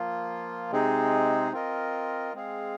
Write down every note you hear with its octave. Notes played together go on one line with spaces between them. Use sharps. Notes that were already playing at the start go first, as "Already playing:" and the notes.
Already playing: F3 A#3 F4
C3 G#3 C4 D#4 G#4
C4 F4 A#4 D#5
G#3 C4 G#4 F5